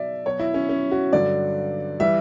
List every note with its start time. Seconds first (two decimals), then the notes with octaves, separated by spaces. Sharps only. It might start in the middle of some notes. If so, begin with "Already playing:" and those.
Already playing: B2 F#3 D5 E5
0.26 B2 F#3 C#5
0.39 E4
0.54 C#4
0.69 C#4
0.92 F#4
1.13 G2 D3 F#3 D5
2.00 E3 G3 E5